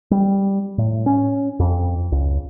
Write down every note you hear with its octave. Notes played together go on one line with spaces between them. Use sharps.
G3
A2
C#4
F2
C#2